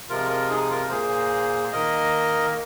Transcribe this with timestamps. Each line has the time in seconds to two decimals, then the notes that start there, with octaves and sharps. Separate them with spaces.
0.09 C3 F3 G#3 F4 A#4
0.30 F4 A#4
0.50 D#4 G#4
0.70 F4 A#4
0.90 A#2 A#3 G#4 C5
1.73 D#3 A#3 A#4 D#5